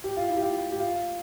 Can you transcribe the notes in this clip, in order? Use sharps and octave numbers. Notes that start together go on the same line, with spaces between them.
G4
F4
E4
G4
F4
G4
F4